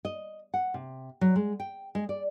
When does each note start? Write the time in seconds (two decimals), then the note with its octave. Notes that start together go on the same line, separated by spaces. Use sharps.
0.05 D#5
0.54 F#5
0.74 C3
1.21 F#3
1.36 G#3
1.60 G5
1.95 G#3
2.09 D5